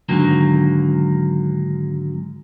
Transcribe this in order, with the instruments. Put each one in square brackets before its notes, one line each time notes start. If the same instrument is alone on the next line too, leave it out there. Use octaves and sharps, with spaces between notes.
[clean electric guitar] G#2 D3 D#3 F#3 A#3